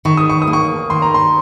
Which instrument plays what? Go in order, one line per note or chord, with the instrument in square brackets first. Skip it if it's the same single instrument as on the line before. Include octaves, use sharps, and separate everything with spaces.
[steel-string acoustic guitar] D#3 [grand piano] C#6
[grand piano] D#6
C#6
D#6
[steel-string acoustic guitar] A#3
[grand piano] C#6
[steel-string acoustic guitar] D#3 [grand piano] C6
[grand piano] A#5
C6